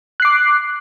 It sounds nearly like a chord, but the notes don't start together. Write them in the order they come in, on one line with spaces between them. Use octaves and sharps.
F#6 C7 D6